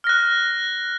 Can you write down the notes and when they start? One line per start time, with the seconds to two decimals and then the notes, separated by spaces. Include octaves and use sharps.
0.04 F6
0.07 A#6
0.09 F#6